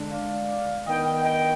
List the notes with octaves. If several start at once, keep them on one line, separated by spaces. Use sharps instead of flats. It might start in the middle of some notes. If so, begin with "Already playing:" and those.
Already playing: D3 G#3 D4
D5 F5
D#3 B3 D4 D#5 G5
D#5 G5